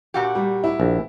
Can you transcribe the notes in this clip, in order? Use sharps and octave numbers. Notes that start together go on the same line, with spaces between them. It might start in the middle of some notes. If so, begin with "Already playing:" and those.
A#2 F#4 G4
G3
E4
A#1